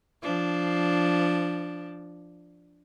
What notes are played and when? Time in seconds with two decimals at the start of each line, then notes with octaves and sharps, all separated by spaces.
0.22 F3 D4